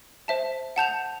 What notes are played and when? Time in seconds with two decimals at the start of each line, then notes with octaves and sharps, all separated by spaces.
0.28 C5 E5 A5
0.76 F#5 A5 G6 F7